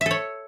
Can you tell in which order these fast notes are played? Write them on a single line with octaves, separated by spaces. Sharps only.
E5 A4 C#5